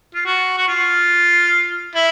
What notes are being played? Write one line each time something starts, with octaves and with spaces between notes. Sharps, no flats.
F4
F#4
F#4
F4
E4